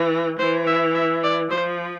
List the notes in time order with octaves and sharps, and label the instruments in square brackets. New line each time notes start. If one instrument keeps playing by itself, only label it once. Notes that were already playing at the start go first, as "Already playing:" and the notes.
Already playing: [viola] E3
[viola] E3 [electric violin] C5
[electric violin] E5
E5
D5
[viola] F3 [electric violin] C5